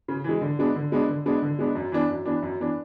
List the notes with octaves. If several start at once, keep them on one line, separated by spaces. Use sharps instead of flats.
C#3
E3 G#3
D3
G#3 B3 D4
D3
G#3 B3 D4
D3
G#3 B3 D4
D3
G#3 B3 D4
F#2
E3 B3 D4
F#2
E3 B3 D4
F#2
E3 B3 D4